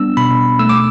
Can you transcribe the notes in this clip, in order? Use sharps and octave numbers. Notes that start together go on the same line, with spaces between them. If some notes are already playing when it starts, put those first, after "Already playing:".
Already playing: G3 B3 D4 E6
B2 B5
A3 E6
D6